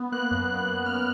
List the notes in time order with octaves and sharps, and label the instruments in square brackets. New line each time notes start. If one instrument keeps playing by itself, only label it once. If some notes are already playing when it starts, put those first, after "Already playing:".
Already playing: [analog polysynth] B3
A#3 F#6
F#2
F#2
F#2
F#2 F6